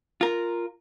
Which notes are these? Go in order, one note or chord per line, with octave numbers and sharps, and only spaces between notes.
F4 A#4